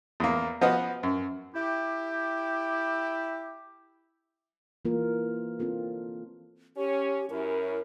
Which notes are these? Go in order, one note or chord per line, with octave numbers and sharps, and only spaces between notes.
E2 A#3
F3 B3 F#4 D#5
F#2
E4 G4
E3 A#3 F4 A#4
C4 D4 F4 A4
C#4 G4 C#5
F#2 C#4 E4 A#4